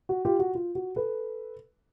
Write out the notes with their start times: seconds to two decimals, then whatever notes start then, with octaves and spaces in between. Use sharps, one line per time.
0.09 F#4
0.25 F4 G4
0.39 F#4
0.55 F4
0.75 F#4
0.96 A4 B4